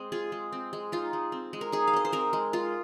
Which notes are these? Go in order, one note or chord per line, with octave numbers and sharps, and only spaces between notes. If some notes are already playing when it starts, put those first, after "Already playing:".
Already playing: G#3 C4
F4 G#4
G#3
C4
G#3
D#4 F4
G#3
C4
G#3
A#4
D#4 G#4
F5
G#3 D#5
C5
C4 A#4
G#3
G#3 F4